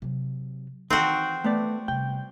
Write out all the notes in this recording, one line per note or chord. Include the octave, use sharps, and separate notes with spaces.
C3 F#3
D#3 E3 C4 D#4 F#4
A3 B3 D5
C3 G3 G5